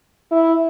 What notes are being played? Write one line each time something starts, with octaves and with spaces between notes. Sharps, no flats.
E4